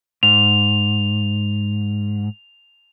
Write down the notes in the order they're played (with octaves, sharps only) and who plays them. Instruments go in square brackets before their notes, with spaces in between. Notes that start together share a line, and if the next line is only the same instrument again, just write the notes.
[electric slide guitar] G#2 [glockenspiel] F7